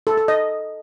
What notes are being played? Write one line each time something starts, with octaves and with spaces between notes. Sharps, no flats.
A4
A4
D#5